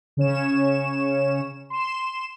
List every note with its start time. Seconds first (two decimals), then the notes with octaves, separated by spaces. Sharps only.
0.17 C#3 C#4 C#5 E7
1.70 C6 E7